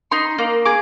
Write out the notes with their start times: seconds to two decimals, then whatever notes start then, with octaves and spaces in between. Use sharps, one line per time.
0.12 D#4 C6
0.38 A#3
0.65 G#4 D6